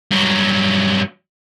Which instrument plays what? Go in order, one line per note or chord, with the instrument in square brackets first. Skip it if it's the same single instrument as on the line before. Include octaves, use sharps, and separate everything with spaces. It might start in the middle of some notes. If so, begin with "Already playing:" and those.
[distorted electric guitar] G2 F#3